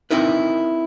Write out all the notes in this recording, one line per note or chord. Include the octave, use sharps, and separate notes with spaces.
C4 D#4 E4 A#4 B4